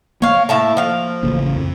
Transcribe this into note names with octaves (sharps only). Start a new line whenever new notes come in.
A#3 C#5 F5
A2 E5 A5
F3 F5
A1 C#3
F2